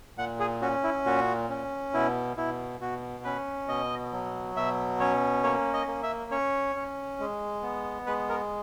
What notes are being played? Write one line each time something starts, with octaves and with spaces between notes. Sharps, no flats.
A#2 F#5
G#4
C#4 F#4
E4
A#2 F#4
C#4
B2 E4
B2 E4
B2 F#4
C#4 B4
B2 D#5
F#3
B2 E5
C#4 C#5
A#3 C#5
D#5
A#3
E5
C#4 C#5
C#4
G#3
B3
G#3 B4
A#4